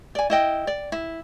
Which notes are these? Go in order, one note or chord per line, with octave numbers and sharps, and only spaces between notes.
D5 G#5
E4 D#5 G5
D5
E4